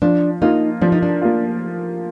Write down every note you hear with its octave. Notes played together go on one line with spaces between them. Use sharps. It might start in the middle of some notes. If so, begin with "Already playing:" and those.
F3 D4
A#3 D#4 F4
F3 D4
D#4
D4
A#3 F4